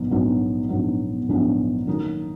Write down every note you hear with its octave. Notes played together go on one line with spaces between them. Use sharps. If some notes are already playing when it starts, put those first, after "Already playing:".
Already playing: A#1 G#2 F#3 B3
A#1 G#2 F#3 B3
A#1 G#2 F#3 B3
A#1 G#2 F#3 B3
D#3 F#3 A#3 D#4